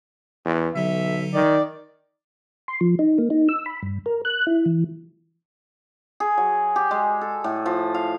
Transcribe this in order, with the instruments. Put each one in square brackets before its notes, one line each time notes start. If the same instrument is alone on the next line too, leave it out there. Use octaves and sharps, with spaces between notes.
[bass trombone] E2
[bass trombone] B1 [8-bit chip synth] D3 F#3 [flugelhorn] E5
[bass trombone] D#3 [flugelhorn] D5
[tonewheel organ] C6
F3
D#4
A#3
D#4
E6
B5
G2
A#4
F#6
E4
E3
[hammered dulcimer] G#4
F#3
G4
G#3
A4
A2
F3
F5